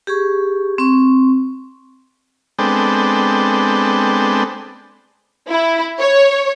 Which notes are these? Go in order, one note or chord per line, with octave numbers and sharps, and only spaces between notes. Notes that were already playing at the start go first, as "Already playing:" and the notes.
G4 G#4 C#6
C4 C#6
G#3 B3 C4 D4 A4 G5
E4
C#5